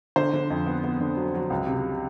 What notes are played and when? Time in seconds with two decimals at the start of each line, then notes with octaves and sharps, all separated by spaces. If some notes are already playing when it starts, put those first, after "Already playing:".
0.16 D3 C5
0.34 D3
0.50 F2
0.66 B3
0.84 B3
1.01 D3
1.17 F#3
1.35 F#3
1.50 C#2
1.67 C3